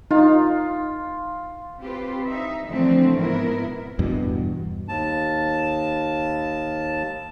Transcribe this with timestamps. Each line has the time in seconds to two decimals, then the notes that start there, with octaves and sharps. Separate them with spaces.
0.11 D#4 F4
1.81 C4 F4 G4 B4
2.26 D#4 E5
2.69 D3 E3 F3 G#3 A3 C4
3.16 G#2 B2 B3 E4 A#4
3.99 E2 G2 B2
4.88 D#2 A5